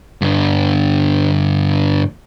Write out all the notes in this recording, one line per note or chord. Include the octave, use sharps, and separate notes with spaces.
G2 D3